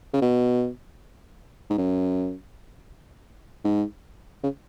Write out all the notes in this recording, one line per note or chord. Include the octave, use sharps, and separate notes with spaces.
C#3
B2
G#2
F#2
G#2
C#3